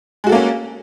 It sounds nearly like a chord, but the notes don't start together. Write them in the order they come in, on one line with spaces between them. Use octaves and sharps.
G#3 F#4 A4 A#3 C#4